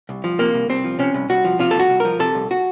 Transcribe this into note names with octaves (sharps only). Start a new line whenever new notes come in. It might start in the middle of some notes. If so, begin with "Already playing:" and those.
C2
F3
C3 A#3
C2
C2 C4
F3
C3 C#4
C2
C2 F#4
F3
C3 F4
A4
C2 F#4
C2
F3 A#4
C3 A4
C2
F#4